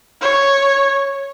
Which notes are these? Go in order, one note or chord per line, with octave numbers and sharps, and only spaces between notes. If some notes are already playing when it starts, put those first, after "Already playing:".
C#5